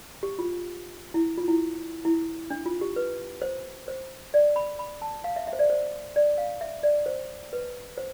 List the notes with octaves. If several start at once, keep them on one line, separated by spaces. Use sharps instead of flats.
G4
F4
E4
F4
E4
E4
D4
F4
G4
B4
C5
C5
D5
B5
B5
A5
F5
E5
E5
C5
D5
C5
D5
F5
E5
D5
C5
B4
C5